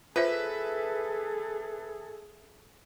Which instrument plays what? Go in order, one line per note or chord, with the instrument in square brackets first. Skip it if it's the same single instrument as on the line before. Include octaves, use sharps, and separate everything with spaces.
[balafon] F4 C5 [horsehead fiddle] G#4 A4 [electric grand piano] B4 [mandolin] E5